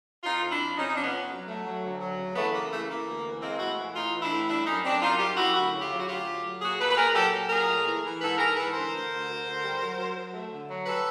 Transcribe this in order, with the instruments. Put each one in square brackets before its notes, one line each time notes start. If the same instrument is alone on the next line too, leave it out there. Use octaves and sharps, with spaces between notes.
[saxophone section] F2 D#4 F4
F2
D4 E4
F3
C3 C#4 D#4
D#4
F3 D4
B3 C#4
F2
F#3
A3
F#3
D2
F#3
C#3
E3 A3 B3
C#3 A#3
E3 A3
E3 A#3
D2
E3
G#3 A#3 C4
A2 E4 F#4
E3
A2 D#4 F4
E3
D4 E4
A2
G3 D4 E4
F#2 C#4 D#4
F#2 C4 D4
F#2 D#4 F4
G3 F4 G4
F#2 E4 F#4
D2 E4 F#4
C#3
F4 G4
F#3
F#4
D2 F4 G4
A3
F#3
A#2 F#4 G#4
A#2 A4 B4
B4
A#2 G#4 A#4
F#3 G4 A4
F#3
A#2 G#4 A#4
A3
E3
E3
G#2 A4 B4
G#2 G#4 A#4
E3 A4 B4
D3 A#4 C5
D2
D2
D2
D2
G3
F#3
F#3
F#3
A3
D3
F#3
G3 A4 B4